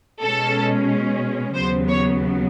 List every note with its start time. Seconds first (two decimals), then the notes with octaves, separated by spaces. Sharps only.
0.23 B2 G#3 C#4 A4
1.54 D#2 C#3 F#3 B3 C5
1.88 C#5